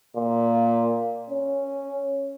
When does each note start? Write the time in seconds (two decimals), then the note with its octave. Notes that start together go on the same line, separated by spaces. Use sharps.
0.17 A#2
1.30 C#4